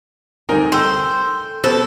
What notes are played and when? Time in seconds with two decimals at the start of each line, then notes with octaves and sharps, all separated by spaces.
0.49 D2 G3 C4 D#4 A#4 G#5
0.72 A4 C5 G5 E6
1.64 B2 A4 B4 C5